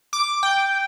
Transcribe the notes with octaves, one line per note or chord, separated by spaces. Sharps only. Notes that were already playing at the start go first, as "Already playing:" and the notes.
D6
G5